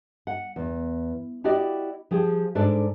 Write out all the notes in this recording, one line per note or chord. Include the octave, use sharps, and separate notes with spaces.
F#5
E2
E4 F#4 G4 D5 D#5
F3 G4 G#4
G#2 D4 A4 D5